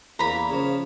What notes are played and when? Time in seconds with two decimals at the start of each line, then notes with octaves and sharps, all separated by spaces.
0.19 E2 A#3 A#5 B5
0.49 C#3 F3